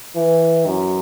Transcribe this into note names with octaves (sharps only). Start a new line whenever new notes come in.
E3
F#2